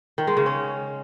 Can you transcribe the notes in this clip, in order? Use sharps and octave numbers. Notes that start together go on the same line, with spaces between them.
D#3
G#3
C#3
C#4